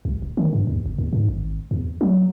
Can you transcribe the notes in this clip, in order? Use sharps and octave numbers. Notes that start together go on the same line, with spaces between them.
C2
D#1
D#3
G2
D#2
F#1
D#2
G#2
G#1
E2
F#3